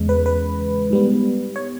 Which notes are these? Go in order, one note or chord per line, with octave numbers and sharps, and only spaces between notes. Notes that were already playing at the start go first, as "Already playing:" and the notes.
Already playing: E2 C#3 G#3
B4
B4
G#2 G3 B3
C#5